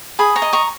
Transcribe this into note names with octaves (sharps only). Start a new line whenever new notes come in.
G#4 B5 D#6
A#5 C#6
D#5
A#5 C#6